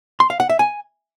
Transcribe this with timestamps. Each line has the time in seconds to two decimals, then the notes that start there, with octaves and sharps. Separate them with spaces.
0.20 C6
0.30 F5
0.40 F#5
0.50 E5
0.59 G#5